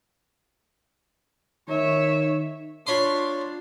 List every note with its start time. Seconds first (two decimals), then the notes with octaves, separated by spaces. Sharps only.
1.69 D#3 C#5 E5
2.87 D4 F4 C#5 B5 C6